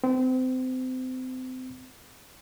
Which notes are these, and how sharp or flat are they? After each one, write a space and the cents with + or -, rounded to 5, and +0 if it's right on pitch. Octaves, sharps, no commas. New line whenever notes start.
C4 -30